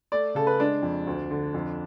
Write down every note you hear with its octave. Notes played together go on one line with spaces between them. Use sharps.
A3 D5
C#3 A4
B4
G#3 D4
F2
D2
D3
F2